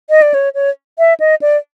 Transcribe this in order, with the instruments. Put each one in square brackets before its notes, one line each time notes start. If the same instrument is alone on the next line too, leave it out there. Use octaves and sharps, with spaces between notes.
[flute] D#5
D5
C#5
C#5
E5
D#5
D5